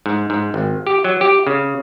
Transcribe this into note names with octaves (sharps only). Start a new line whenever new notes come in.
G#2
G#2
G#1
G4
F#3
G4
C#3